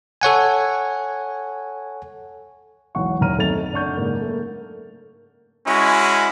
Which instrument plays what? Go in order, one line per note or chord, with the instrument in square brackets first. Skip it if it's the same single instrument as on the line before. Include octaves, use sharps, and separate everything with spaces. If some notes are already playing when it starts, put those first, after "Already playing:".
[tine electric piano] A4 C#5 F#5 G#5
[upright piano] E1 B1 E3 F#5 C#6
F#1 D#2 A#5 F6 D#7
B1 A3 C4 D#4 A6 F7
F#1 D4 F#5 C#6 G6
G#2 C#3 A#3
A3 A#3
[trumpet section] G#3 C#4 E4 F#4